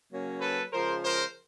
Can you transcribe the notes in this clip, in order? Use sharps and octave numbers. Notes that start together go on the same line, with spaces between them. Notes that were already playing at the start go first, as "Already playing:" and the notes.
C#3 F#3 A#3 C#4
A4 B4
C#3 F3 G#3 A#4 C5
A#4 C5